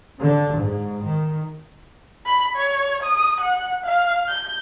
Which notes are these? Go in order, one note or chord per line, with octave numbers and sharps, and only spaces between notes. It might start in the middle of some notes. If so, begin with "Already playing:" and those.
D3
G#2
D#3
B5
C#5
D#6
F#5
F5
G6